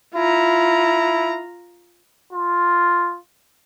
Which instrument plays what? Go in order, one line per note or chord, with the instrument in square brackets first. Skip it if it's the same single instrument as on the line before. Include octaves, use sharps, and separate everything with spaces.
[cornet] E4 [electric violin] F4 A#5
[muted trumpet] F4